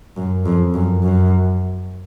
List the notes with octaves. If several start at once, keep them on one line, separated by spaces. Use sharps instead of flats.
F#2
F2
F#2
F#2